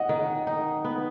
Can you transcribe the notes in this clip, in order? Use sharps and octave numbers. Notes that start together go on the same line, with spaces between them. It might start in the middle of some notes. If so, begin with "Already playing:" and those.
Already playing: D#5 F#5
D#3
D#4
B3